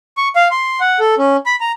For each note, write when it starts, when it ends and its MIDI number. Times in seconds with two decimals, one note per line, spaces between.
0.17 0.28 85
0.36 0.48 77
0.51 0.80 84
0.80 0.99 78
0.99 1.15 69
1.18 1.37 61
1.46 1.56 83
1.61 1.72 82